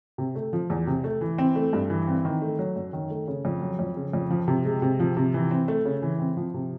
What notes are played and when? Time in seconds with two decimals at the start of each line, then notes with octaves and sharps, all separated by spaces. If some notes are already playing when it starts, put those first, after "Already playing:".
0.18 C3
0.35 A3
0.53 F3
0.70 E2
0.87 C3
1.04 A3
1.21 E3
1.38 C4
1.56 A3
1.73 G2
1.90 E3
2.07 C4
2.25 D#3
2.42 A3
2.59 F#3
2.76 F#2
2.93 D#3
3.10 A3
3.28 C#3
3.45 F2
3.62 F#3
3.79 F2
3.96 C#3
4.13 F2
4.30 F3
4.48 C3
4.65 G#3
4.82 C3
4.99 F3
5.17 C3
5.34 E3
5.51 C4
5.68 A3
5.85 C#3
6.02 E3
6.20 C4
6.37 F3
6.54 C3